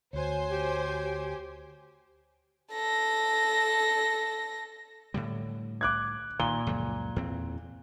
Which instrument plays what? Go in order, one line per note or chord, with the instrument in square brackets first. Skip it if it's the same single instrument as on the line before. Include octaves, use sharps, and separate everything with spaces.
[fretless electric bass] D2 [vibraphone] F#4 C#5 [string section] C5 G#5
[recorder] G4
[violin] A4 A#6
[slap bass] A2 D3 G3
[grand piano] D6 F#6 G#6
[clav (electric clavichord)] A#2 [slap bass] D#3 [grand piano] G7
[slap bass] C#2 F#2 F3
E2 C4